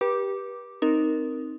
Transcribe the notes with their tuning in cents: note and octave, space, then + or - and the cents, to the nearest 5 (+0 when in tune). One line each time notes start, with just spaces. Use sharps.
G4 +0 B4 -35 D6 +0
C4 +0 D#4 +0 A#4 +0